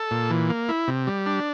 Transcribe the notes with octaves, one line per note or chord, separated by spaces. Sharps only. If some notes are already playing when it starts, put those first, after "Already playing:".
Already playing: A4
A#2
E3
A#3
E4
C3
G3
D4